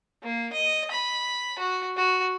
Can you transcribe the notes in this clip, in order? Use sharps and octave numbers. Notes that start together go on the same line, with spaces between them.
A#3
D#5
B5
F#4
F#4